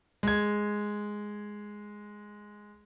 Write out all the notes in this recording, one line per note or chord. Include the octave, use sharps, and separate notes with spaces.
G#3 G#6